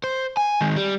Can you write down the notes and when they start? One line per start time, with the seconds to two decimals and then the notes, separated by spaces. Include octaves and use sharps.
0.04 C5
0.37 G#5
0.61 D#3 G#3
0.76 G3